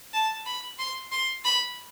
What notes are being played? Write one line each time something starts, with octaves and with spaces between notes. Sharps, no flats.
A5
B5
C6
C6
B5